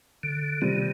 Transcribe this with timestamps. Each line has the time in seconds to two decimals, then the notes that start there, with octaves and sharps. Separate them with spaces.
0.23 D3
0.61 C3 D#3 G3 C4